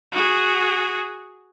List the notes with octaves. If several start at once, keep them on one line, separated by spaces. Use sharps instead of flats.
F#4 G#4